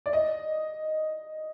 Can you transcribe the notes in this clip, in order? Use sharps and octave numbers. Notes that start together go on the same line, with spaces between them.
D5
D#5